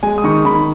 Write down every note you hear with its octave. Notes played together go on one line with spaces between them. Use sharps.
G#3 G#5
D#6
D#3 C#6
D#3 B5